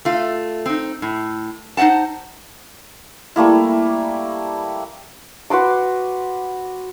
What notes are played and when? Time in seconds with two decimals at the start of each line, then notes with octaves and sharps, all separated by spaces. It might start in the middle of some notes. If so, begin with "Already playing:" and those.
0.05 A3 F4
0.66 C4 D#4
1.02 A2
1.77 D#4 C5 D#5 F#5 A5
3.36 G3 A3 A#3 E4
5.50 F#4 B4 C6 D6